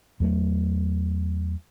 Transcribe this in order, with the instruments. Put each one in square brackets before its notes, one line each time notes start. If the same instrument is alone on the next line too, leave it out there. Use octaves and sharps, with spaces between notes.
[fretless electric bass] E2 F#3 A3